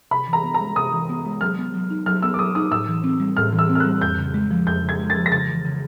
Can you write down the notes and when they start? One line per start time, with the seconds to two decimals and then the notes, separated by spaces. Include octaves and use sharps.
0.11 C3 B5
0.28 E3
0.33 A#5
0.44 B3
0.54 A#5
0.60 G#3
0.76 C3 D#6
0.93 E3
1.09 B3
1.25 G#3
1.41 F#3 F6
1.58 B3
1.74 F#3
1.90 D#4
2.06 F#3 F6
2.22 B3 E6
2.34 D6
2.39 F#3 D#6
2.55 D#4 D#6
2.71 A2 E6
2.88 E3
3.04 C4
3.20 G3
3.37 A2 F6
3.53 E3
3.59 E6
3.70 C4
3.75 F6
3.80 G3 F#6
4.01 F2 G6
4.18 C#3
4.34 G#3
4.51 F3
4.67 F2 G6
4.83 C#3
4.89 G#6
4.99 G#3
5.10 A6
5.16 F3
5.26 A#6
5.32 C#3 A6
5.48 E3
5.65 C#3